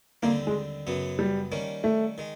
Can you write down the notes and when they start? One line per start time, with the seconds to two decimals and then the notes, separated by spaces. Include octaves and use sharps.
0.23 D#2 D3 G3 A#3 C4
0.47 G#3
0.87 F#2 C#3 F#3 B3
1.19 G3
1.52 D#3 G3 A#3 C#4
1.84 A3
2.18 D#3 G#3